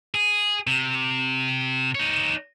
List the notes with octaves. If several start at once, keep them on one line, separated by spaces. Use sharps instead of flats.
G#4
C3
D#4 C#5